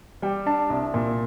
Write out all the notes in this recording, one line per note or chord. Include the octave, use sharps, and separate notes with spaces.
G3 G5
D4 A5
C2
A#2